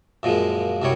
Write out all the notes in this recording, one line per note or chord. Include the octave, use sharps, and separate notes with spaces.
F#2 A#2 F3 G#3
C2 F#2 C3 G3 C#5